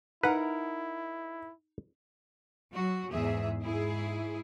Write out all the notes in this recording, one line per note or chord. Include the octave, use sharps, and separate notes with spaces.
D#4 E4 A#4 B4 F#5 A#5
F#3 F#4
E2 G#2 G#4 E5
G#2 E4 G#4